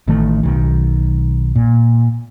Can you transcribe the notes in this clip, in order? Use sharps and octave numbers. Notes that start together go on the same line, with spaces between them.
A1 D#3 A3
B1 D#3
A#2